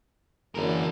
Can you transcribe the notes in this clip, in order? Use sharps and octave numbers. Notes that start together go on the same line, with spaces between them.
F#1 D3 E3 G#4 A#4